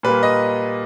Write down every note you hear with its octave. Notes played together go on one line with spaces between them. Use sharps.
A#2 G3 A#3 B4
D#5